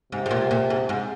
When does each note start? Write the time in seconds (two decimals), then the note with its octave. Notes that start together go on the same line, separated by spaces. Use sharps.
0.12 G#2 C3
0.26 G#2
0.31 A#2
0.51 A#2
0.70 G#2
0.89 G#2